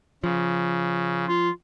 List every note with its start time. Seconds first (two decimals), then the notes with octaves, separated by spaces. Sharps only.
0.24 C#3 F3
1.27 F4